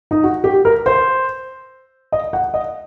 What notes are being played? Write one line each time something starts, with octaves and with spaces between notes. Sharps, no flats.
D#4
F#4
G4
A#4
C5
D#5
F#5
D#5